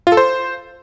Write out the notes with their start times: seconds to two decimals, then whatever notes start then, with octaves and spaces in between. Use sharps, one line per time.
0.07 F4
0.12 A4
0.17 C5